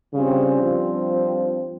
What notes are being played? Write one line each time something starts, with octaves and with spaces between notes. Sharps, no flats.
G2 C#3 G3 C4 F4
F3